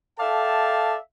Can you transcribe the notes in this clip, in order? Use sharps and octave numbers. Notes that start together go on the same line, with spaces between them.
A4 D5 E5 F5 G5 A5